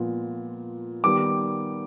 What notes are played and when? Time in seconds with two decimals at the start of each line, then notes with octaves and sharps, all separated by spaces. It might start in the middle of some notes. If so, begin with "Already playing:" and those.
Already playing: A#2 F3 G#3 B3
1.04 D#3 G3 B3 D6